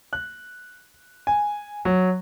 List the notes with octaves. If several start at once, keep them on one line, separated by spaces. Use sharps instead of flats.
F#6
G#5
F#3